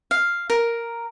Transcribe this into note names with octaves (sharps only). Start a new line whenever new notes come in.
F5
A#4